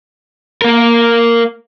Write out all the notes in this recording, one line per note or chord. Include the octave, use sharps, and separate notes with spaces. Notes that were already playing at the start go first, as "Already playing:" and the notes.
A#3 A#4